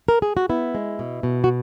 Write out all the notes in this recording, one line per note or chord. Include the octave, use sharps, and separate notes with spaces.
A#4
G#4
F#4
B3 E4
G#3
B2
B2
F#4